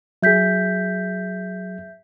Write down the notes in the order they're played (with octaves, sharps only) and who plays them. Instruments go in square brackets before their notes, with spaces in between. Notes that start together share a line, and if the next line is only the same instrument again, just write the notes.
[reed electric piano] F#3 G#4 [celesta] E5 G6 B6